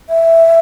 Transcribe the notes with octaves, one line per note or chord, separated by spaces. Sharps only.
E5